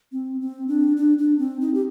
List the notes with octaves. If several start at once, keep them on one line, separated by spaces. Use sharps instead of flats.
C4
C4
D4
D4
D4
C4
D#4
G4